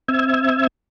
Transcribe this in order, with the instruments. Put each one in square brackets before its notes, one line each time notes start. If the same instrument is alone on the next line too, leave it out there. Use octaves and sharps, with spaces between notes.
[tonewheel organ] C4 E5 E6 G#6